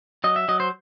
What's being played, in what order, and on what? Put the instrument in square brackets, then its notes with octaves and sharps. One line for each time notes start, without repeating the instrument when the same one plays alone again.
[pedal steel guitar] F#3 D#5
E5
F#3 D#5
C5